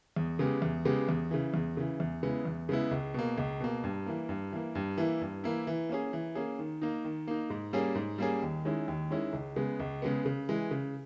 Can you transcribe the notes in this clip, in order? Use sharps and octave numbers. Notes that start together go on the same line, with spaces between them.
E2
C#3 G#3 B3 G4
E2
C#3 G#3 B3 G4
E2
C#3 E3
E2
C#3 E3
E2
C#3 G#3 B3 E4
E2
C#3 G#3 B3 E4
C#2
B2 A#3
C#2
B2 A#3
G2
E3 A#3
G2
E3 A#3
G2
E3 A#3 E4
G2
E3 A#3 E4
E3
A#3 C#4 G#4
E3
A#3 C#4 G#4
D#3
A#3 D#4
D#3
A#3 D#4
G#2
G3 A#3 C#4 G#4
G#2
G3 A#3 C#4 G#4
D#2
D#3 G#3 C#4 E4
D#2
D#3 G#3 C#4 E4
C#2
C#3 G#3 B3
C#2
C#3 G#3 B3
C#3
E3 G#3
C#3